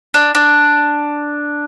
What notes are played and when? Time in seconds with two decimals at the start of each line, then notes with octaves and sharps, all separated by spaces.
0.14 D4
0.35 D4